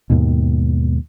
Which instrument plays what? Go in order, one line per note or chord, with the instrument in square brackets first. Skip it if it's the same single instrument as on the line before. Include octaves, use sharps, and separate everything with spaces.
[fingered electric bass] D#2 G#2 B2